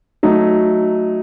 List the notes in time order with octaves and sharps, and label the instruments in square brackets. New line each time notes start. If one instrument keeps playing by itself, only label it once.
[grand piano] F#3 A3 D#4